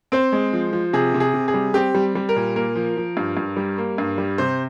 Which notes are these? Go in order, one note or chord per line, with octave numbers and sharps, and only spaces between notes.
C4 C5
G#3
F3
F3
C3 G#4
C3
G#4
C3
G#4
G3
C4 G4
G3
G3
A#4
A#2
A#3 A#4
F3
F3
G2
G2
G3
A#3
G2
G3
C3 C5